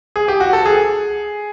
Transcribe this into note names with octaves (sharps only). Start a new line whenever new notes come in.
G#4
G4
F#4
A4
G#4